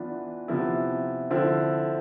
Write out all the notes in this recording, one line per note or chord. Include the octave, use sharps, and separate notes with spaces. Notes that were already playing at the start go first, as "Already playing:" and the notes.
Already playing: E3 B3 D4 F4
C3 F3 B3 E4
D3 F3 C4 E4